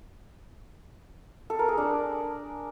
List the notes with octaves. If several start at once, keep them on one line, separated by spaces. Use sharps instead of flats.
A4
A#4
G#4
D4